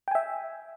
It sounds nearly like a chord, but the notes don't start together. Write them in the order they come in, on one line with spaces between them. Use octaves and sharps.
G5 G#5 E5